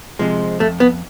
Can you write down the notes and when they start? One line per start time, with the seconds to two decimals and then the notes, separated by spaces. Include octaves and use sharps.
0.19 C3 F3 G#3
0.60 F2 A3
0.80 B3